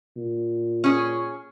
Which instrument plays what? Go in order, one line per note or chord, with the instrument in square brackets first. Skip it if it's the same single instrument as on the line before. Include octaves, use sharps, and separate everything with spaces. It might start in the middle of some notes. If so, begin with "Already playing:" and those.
[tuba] A#2
[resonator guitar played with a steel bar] C#4 G#4